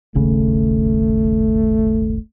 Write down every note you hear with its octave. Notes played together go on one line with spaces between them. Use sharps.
D#1 G#1 C#3 A3